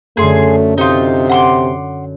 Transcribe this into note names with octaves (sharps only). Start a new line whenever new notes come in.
F#2 D3 A3 G#4 C6
C3 D#4 F4
F#5 C6 D6